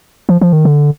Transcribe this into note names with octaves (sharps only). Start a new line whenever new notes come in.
F3
F3
D#3
D3